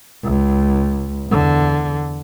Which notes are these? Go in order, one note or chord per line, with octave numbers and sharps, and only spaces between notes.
C#2
E2 D3